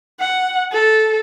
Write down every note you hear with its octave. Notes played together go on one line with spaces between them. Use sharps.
F#5
A4